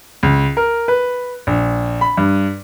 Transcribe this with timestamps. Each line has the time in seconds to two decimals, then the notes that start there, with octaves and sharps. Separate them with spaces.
0.23 C#2
0.57 A#4
0.88 B4
1.47 A#1
2.01 B5
2.17 G2